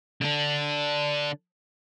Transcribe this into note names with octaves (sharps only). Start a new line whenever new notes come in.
D3 D4